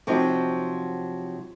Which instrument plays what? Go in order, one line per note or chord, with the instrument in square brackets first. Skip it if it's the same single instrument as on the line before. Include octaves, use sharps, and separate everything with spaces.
[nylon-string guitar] C3 F3 F#3 D#4